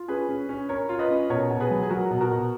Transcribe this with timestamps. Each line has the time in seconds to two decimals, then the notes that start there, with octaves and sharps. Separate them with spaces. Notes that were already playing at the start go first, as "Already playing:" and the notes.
Already playing: F4
0.08 C#4 G#4 B4
0.29 C#4
0.49 C#4
0.69 C#4 A#4 C#5
0.89 F4
0.99 B4 D#5
1.10 C#4
1.30 B2 A#4 C#5
1.50 B2
1.60 G#4 B4
1.71 F#3
1.83 G#4
1.90 F#3 F#4 A#4
2.11 B2
2.21 F#4 A#4
2.31 B2